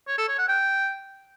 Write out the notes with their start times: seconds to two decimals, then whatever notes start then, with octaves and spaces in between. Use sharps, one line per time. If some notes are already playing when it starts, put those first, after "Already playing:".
0.08 C#5
0.18 A4
0.28 C#5
0.38 F#5
0.49 G5